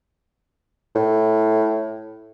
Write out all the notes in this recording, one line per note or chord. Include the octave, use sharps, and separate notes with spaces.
A2